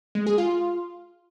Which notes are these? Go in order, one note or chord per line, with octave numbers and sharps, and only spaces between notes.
G#3
G#4
F4